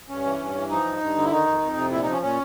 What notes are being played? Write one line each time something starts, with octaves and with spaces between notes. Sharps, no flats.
G2 C#4
E3
G2
E3
F3 D#4
G2
G2
D3
E4
D#3 D#4
F2
F2
C3
A#2 E4
D#4
F3
C#4
A#2 C#4